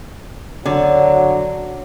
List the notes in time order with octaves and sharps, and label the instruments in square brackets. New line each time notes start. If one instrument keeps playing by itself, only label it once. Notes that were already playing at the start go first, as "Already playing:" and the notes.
[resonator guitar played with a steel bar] D3 [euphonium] F#3